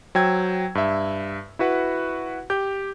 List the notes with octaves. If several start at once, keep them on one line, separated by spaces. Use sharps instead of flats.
F#3 C5 G5 E6 G#6
G2 E5
E4 F#4 B4 F#5
G4 G6